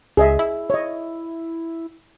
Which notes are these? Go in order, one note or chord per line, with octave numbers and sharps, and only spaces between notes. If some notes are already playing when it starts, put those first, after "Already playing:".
C#2 G#4 D#5 E5
E4
C#5 D#5